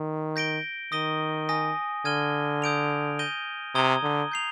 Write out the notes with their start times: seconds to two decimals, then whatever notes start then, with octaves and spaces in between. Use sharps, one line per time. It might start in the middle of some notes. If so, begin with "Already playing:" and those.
Already playing: D#3
0.36 G6 A#6 D7 G7
0.92 D#3 D#6 A#6 D#7 G7
1.49 G#5 D#6 A#6
2.05 D3 F6 G#6 D#7 G7
2.62 D#6 G6 D7 F7
3.19 G6 A#6 D#7 G7
3.75 C3 A#5 D#6 G#6 D#7 G7
4.03 D3
4.32 G6 C7 F7